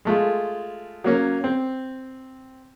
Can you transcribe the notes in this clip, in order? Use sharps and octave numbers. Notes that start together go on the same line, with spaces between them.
G#3 A3 F4
F#3 A#3 C#4
C4